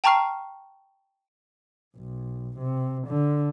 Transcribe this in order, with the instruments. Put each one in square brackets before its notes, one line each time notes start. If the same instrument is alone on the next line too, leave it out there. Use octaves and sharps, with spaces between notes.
[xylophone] G5 A5 A#5 C#6 F6 C7
[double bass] B1
C3
D3